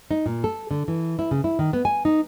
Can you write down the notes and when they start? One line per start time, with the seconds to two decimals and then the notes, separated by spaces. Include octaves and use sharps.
0.11 D#4
0.26 A#2
0.44 A4
0.71 D3
0.88 E3
1.19 E4
1.31 C#3
1.44 E4
1.59 D#3
1.73 B3
1.85 G#5
2.05 D#4